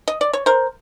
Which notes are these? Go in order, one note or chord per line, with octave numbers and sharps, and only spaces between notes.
D#5
D5
C#5
A#4 C5